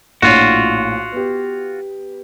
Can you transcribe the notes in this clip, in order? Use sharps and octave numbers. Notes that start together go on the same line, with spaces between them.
A#1 A2 F4 F#4 C#5
B3 G4